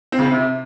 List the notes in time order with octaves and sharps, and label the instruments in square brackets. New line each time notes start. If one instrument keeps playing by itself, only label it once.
[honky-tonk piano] C4
C#3
C4
C3